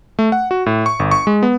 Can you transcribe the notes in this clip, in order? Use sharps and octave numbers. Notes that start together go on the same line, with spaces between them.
A3
F#5
F#4
A2
C#6
G1
C#6
G#3
B3